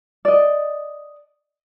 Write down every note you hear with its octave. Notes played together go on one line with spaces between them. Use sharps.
D5 D#5